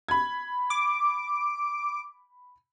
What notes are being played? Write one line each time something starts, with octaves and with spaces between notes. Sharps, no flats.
B5 G#6
D6